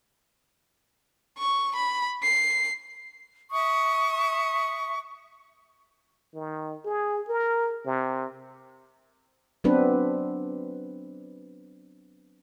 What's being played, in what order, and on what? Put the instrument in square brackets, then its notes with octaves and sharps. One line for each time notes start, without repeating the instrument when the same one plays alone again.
[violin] C#6
B5
C7
[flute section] E5 C#6 D#6
[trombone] D#3
G#4
A#4
C3
[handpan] F#3 B3 C4 D4 B4